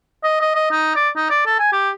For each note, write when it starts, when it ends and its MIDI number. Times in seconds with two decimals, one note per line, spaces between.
0.24 0.37 75
0.41 0.50 75
0.55 0.70 75
0.71 0.94 63
0.96 1.10 74
1.16 1.27 63
1.30 1.41 74
1.46 1.58 69
1.59 1.72 80
1.72 1.90 67